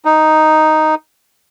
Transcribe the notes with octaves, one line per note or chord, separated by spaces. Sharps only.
D#4